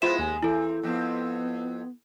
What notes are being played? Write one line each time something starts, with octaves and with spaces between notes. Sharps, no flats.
G#3 B3 E4 F4 C5 E5 E7
D#2 G#5
E3 C4 E4 A4
F2 B3 C4